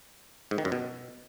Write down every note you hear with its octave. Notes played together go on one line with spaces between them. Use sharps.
G#2
D#3
F#2
B2